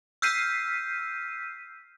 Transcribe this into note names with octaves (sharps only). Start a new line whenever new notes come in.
E6 F6 G6 B6 C7 D#7